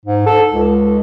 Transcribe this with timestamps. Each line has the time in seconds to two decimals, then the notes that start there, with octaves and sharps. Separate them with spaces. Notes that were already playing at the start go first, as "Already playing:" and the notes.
0.05 G#2
0.26 A4
0.51 C#2